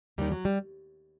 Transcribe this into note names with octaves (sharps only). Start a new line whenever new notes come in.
D#2 D#3 G3
F#3
G3